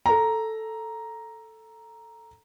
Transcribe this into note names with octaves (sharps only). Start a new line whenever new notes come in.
A4 A#5